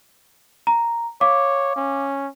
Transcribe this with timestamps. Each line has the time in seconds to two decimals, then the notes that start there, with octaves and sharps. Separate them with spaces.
0.67 A#5
1.21 C#5 F5 D6
1.76 C#4